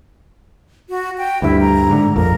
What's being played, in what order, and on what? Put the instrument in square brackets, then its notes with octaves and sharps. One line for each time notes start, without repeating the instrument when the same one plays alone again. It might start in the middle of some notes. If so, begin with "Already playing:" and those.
[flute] F#4
G5
[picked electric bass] D2 G2 [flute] E4
[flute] A#5
[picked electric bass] G#2 D3
[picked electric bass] A#1 F2 A2 [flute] A#4